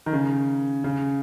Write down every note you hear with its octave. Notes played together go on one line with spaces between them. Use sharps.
D#3
C#3
C#3